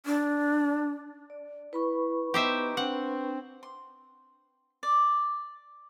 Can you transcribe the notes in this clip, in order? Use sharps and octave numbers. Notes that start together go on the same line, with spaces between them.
D4
D5
E4 B4 B5 C#6
B3 D#4 G4 C5 E5
C4 D4 F#5
C6
D5